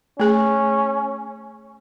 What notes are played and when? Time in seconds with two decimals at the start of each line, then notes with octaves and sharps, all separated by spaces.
0.20 A3 C#4 G#4